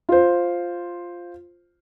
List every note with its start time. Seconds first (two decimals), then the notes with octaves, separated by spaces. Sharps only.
0.09 F4 C5